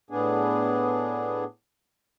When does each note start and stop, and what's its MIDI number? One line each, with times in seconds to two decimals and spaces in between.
0.11 1.44 45
0.11 1.44 59
0.11 1.44 62
0.11 1.44 68